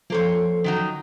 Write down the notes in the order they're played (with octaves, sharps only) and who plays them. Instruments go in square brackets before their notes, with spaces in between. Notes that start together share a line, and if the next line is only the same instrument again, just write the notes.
[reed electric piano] F3 A4 [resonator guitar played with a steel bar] A#3 C5 C#5
[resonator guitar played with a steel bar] D#3 F#3 D#4